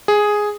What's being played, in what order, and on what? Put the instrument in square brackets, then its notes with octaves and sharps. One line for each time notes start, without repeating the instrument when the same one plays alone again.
[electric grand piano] G#4